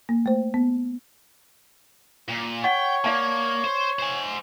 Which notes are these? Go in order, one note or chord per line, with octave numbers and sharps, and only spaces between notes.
A#3
A3 C5
B3
A#2
C#5 F#5 G5
A#3 D5 F5 A5
C5
C5 G#5